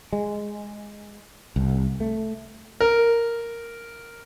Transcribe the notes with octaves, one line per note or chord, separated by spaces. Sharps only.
G#3
C2
A3
A#4